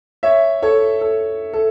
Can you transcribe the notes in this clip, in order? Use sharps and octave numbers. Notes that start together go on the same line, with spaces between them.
C#5 E5
A4 C#5
A4
A4